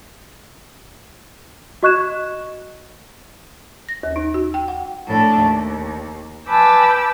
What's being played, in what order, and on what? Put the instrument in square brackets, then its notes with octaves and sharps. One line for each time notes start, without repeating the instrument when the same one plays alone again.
[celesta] F#4 D#5 C#6 F#6 G#6 E7
[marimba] A#6
D#2
D#4
F#4
G5
F#5
[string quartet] A2 A3 D4 A4
D#2
B4 G#5 A5 D6 E6 G6